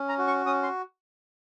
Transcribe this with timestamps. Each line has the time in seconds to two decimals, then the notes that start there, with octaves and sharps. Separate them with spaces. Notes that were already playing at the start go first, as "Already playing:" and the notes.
Already playing: C#4
0.09 A#5
0.18 F#4
0.27 C#6
0.46 C#4 D#6
0.63 C6